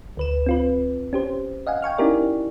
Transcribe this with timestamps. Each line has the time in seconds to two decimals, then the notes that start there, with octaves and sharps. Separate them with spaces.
0.17 D2 B4 E7
0.46 C4 F4 B4
1.13 C#4 G4 C5
1.67 D#5 F5 F#5 G#5
1.82 G5 G#5 C#6 F6
1.98 C#4 D#4 E4 G4 A#4 D5